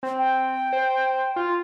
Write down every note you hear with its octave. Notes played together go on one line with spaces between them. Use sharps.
C4
G5
C5
F4